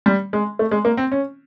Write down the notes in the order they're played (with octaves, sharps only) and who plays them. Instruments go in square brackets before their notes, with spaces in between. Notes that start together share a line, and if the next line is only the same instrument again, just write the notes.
[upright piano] G3
G#3
A3
G#3
A#3
C4
C#4